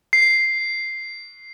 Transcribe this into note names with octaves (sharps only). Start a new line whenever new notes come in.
C7